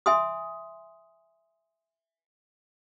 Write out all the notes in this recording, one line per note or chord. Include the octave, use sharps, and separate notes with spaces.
E5 G#5 C6 D#6